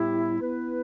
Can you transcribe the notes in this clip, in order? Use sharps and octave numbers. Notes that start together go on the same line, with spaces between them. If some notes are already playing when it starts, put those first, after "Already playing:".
Already playing: A2 G3 B3 E4 G4
B3 E4 B4